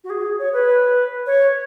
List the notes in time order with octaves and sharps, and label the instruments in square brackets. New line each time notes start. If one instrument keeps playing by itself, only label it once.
[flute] F#4
G#4
C#5
B4
C#5